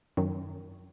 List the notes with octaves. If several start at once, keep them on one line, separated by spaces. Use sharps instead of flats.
F#2 D#3 F#3